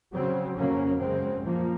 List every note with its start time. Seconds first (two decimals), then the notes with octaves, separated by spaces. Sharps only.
0.13 C#3 F#3 C4
0.56 F2 C#3 F#3 A#3 C#4
1.00 F#2 C#3 G#3 C4
1.44 A#2 F3 A#3